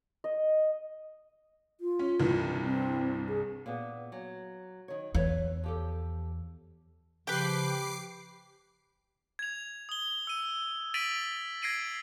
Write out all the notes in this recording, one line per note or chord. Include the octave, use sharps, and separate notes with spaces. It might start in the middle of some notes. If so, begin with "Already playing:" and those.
D#5
F4
C#4
C2 G2 E3
C4
G#4
A#2 B3
F#3
D#3 C#5
E2 B4 C#5 E5
F3 G4 A4
C#3 F3 G4 B4 G5 D6 C7
G#6 F7
D#6 G7
E6 D#7
A6 B6 D7 D#7 F7 F#7
G#6 A#6 C7 D7 D#7 F#7